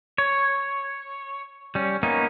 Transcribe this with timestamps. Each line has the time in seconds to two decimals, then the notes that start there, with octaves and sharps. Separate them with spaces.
0.18 C#5
1.75 G3 C#4
2.03 A#3 B3 C#4 D#4